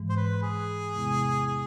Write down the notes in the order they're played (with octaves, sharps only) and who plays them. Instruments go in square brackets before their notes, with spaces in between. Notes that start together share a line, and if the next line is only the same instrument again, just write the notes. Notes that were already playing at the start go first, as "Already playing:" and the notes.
Already playing: [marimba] G#2 E3 G#3
[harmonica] C5
B4
G#4
[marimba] E2 C3 G#3 B3 E4
[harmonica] G#4